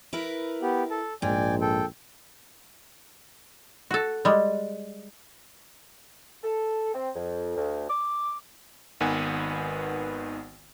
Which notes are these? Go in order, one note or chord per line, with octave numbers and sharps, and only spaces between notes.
E4 A#4 B4
B3 G4
A4 A5
A#1 G#2 D5 G5 G#5
A4 G5
F#4 A4
G3 G#3
A4
C4
F2
D2
D6
G#1 D#3 B3 B4 F#5 G#5